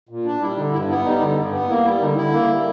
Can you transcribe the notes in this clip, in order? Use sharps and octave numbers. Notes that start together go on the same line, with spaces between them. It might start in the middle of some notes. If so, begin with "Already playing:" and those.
A#2
D4
G3 E4
D3 D#4
G2 E4
B3 E4
G3 D#4
D3
G2
B3
A#3 E4
G3 E4
D3 D#4
D3 E4
A#3
G3